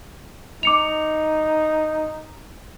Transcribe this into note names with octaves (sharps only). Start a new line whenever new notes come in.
D#4 D6 C#7 F7